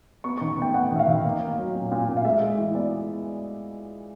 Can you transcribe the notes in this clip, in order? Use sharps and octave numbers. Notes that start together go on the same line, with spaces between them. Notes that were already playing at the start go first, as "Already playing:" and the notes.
B3 C#6
D#3 C#6
B3 G5
B3 F#5
D#3 E5
F5
D#3
A#3
A#3
F#3
A#2
A#2
A#2
F5
G#3 E5
G#3
E3
B3 D5